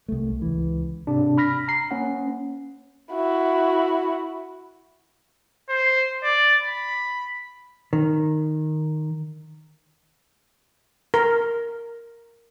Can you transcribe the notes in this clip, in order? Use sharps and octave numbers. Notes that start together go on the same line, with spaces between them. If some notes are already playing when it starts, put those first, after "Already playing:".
C2 A3
C#2 E3
G#2 C3 D4
B5 F6 A#6 B6
A#5 C7
A#3 C#4 F#5
E4 F#4
C5
D5
B5
D#3
A#4